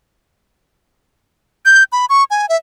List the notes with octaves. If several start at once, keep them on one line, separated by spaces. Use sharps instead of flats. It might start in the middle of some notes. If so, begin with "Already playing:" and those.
G6
B5
C#6
G#5
E5